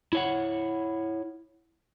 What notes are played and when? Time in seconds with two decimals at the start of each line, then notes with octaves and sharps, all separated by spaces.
0.13 E4 C#5 F#5